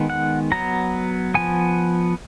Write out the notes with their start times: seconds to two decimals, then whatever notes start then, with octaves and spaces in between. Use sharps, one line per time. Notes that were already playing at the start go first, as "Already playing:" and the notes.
Already playing: D#3 G#3 B3
0.10 F#5
0.52 F#3 B3 A#5
1.34 F3 B3 G#5